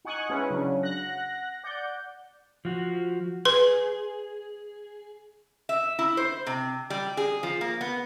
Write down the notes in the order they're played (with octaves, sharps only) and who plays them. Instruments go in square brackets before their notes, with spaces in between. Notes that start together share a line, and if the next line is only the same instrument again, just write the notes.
[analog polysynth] D#4 F#5 G#5 C#6 D#6 F#6
G#3 C#4 E4 B4 F#5
C#3 F#3 D4
F#5 F#6 A#6
D5 F#5 G6
[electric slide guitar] F3 F#4
[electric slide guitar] G#4 [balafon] B4 C6
[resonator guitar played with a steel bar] E5
E4
C5
C3
G3
G#4
F3
A#3
B3